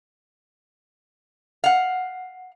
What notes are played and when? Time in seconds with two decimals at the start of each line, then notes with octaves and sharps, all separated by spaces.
1.64 F5 F#5